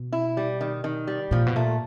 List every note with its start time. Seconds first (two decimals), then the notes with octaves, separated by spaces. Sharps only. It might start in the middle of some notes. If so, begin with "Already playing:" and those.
Already playing: B2
0.13 E4
0.37 G3
0.61 D#3
0.84 D#3
1.07 G3
1.31 A#2 F3
1.47 B2
1.56 A#2 A3